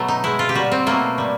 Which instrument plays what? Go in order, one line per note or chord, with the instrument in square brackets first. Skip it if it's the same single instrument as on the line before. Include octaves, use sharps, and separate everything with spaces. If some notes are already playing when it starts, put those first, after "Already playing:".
Already playing: [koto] B2 F#3 A3
D#4
B2 G#3 E4
F4
G4
A#2 G3 F#4
C4
B2 F#3 A3 A#3
A#2 G3